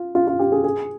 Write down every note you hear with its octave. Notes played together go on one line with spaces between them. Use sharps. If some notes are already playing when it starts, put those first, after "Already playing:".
Already playing: F4
F4
F4
G4
G#4
G#4